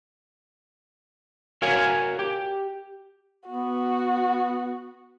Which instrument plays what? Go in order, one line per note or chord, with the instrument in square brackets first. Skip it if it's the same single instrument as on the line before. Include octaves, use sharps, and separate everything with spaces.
[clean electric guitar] F#4 A#4 C#5 F5 G#5
G4
[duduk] B3 [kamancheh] F#4